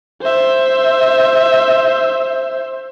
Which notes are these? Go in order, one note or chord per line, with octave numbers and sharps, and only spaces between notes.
C5 E5